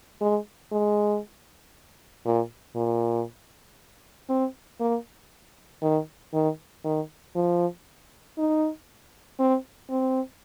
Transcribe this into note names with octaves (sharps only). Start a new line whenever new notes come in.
G#3
G#3
A#2
A#2
C4
A#3
D#3
D#3
D#3
F3
D#4
C4
C4